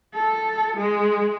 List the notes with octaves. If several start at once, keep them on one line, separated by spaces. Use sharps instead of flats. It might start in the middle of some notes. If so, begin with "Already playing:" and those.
A4
G#3